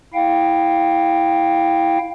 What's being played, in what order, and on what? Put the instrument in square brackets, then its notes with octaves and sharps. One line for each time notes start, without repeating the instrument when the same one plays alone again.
[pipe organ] E4 F5 G5